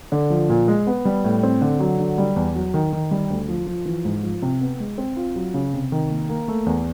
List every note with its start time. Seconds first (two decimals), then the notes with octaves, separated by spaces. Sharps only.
0.12 D3
0.30 F3
0.49 A#2
0.68 G#3
0.87 B3
1.05 G3
1.24 A2
1.43 C4
1.61 D3
1.80 F#3
1.99 D3
2.18 G3
2.36 E2
2.55 F#3
2.74 D#3
2.93 D#3
3.11 G3
3.30 D2
3.49 F3
3.67 F3
3.86 E3
4.05 G#2
4.23 F3
4.42 C3
4.61 B3
4.80 G#3
4.98 C4
5.16 F4
5.36 F#3
5.54 C#3
5.74 C3
5.92 D#3
6.10 A#3
6.29 A#3
6.48 A3
6.66 E2